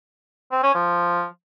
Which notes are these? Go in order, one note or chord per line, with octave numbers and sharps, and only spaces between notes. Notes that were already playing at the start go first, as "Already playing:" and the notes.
C4
C#4
F3